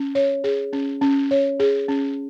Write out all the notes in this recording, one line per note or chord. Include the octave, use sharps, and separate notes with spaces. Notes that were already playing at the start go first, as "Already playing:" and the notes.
Already playing: C#4
C#5
G#4
C#4
C#4
C#5
G#4
C#4